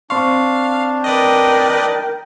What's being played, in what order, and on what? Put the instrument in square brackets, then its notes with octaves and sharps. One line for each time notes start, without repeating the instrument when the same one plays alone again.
[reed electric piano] C4 C6 C#6 [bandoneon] D4 [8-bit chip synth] F5
[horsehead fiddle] A#4 G5 [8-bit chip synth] B4 D5 D#5